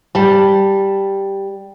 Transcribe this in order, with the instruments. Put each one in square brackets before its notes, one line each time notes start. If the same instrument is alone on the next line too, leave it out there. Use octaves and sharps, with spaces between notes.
[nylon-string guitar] G3 A5